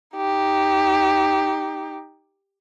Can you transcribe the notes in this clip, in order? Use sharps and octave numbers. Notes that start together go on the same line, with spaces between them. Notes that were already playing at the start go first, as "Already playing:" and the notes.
D#4 G4